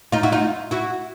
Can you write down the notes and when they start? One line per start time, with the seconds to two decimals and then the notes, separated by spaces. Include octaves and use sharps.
0.12 D#4 F4
0.23 E4 F#4
0.32 D#4 F4
0.71 E4 F#4